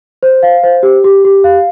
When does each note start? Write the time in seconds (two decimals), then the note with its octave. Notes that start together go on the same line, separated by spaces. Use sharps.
0.23 C5
0.43 F5
0.63 C5
0.83 G4
1.04 G4
1.25 G4
1.44 F5